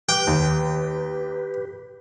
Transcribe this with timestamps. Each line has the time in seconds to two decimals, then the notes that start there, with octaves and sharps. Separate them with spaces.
0.09 G4 B4 G5
0.27 D#2